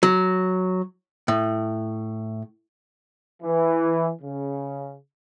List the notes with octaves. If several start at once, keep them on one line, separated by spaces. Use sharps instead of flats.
F#3
A2
E3
C#3